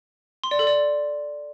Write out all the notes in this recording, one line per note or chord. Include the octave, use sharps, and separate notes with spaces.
C6
D5
A4
D5